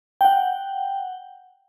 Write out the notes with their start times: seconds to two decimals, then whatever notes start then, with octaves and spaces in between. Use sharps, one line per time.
0.21 F#5 G5